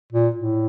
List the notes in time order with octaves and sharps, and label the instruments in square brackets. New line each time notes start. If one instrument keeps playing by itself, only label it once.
[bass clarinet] A#2
A2